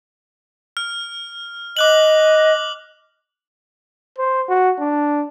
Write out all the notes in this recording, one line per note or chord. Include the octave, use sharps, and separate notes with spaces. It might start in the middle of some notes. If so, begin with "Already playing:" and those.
F6
D#5 D6 F#6 F#7
C5
F#4
D4